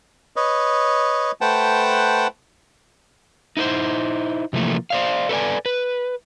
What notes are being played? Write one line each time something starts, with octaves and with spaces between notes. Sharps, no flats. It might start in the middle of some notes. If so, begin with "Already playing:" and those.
B4 C#5 D#5
A3 B4 C5 F#5 G5 A5
D#4 E4 B4 C5
C3 E3 F3 A3 A#3
C5 D5 F5
A4 B4 C#5 D5 G#5
B4